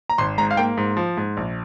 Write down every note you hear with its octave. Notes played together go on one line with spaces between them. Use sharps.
A#5
G#1 C6
G#2 A#5
F5
A#3 G5
G#2
F3
G#2
A#1